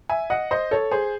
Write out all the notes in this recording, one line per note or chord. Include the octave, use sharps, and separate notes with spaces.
E5 G#5
D#5 F#5
C5 D#5
A4 C#5
G#4 C5